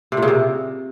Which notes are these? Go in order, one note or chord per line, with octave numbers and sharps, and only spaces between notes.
C3
A#2
C#3
C3